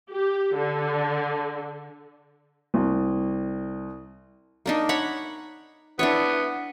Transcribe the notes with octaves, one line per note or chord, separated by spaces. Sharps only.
G4
D3
C2
A#3 D4 D#4
C#5 F#5 B5
B3 D4 E4 C#5